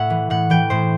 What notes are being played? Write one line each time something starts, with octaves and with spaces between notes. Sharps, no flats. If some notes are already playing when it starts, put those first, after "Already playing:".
Already playing: A2 E5 F#5
E3
A2 F#5
E3 G5
A2 C5